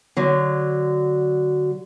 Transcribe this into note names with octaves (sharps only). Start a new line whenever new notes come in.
D3 F#3